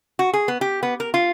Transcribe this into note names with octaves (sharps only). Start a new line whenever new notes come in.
F#4
G#4
B3
G4
B3
A#4
F4